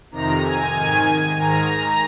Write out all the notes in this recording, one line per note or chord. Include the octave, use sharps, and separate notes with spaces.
F2 C3 D#3 A#5
G#5
G#2 D#3
G#2 D#3 A#5
A#5